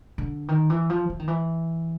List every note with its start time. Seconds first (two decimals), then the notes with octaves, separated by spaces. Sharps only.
0.18 D3
0.48 D#3
0.70 E3
0.90 F3
1.10 E3
1.19 D#3
1.28 E3